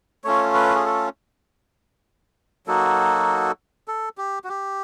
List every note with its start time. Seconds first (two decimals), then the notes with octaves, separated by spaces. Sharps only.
0.24 A3 C#4 F4 C#5
0.54 B4
0.75 G#4
0.86 A4
2.67 F#3 A#3 D#4 F#4 A4
3.88 A4
4.18 G4
4.44 F#4
4.49 G4